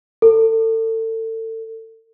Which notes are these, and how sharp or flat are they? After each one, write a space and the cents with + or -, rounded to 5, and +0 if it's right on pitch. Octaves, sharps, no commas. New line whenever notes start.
A4 +30